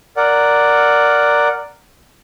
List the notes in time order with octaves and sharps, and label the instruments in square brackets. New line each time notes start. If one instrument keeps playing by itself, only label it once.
[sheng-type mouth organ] A#4 D5 F#5